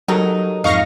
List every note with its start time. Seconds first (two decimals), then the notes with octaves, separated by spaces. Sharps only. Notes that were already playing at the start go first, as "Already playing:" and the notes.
0.08 F#3 D#4 G4 A4 A#4
0.64 F2 G#2 D#4 F5 C#6 A#6